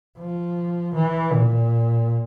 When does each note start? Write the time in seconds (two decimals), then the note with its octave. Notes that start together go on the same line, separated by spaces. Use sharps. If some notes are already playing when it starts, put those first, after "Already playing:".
0.19 F3
0.95 E3
1.33 A#2